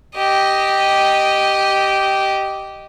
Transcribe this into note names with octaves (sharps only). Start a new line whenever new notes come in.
G4 D#5